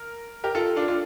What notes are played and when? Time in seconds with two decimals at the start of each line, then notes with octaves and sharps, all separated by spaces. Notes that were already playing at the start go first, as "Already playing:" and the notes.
Already playing: A#4
0.44 G4 A#4
0.55 F4 A4
0.76 D4 F4
0.88 D4 F4